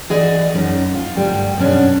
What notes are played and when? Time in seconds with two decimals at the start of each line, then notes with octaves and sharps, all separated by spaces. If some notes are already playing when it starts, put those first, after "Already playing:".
0.10 E3 F#4 G#4 D5 D#5
0.54 F#2 C#4 D#4
0.95 F4
1.15 D2 G2 G3
1.58 F#2 B2 C#4 D4